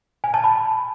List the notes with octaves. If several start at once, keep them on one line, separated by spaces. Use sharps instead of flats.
G#5
A5
B5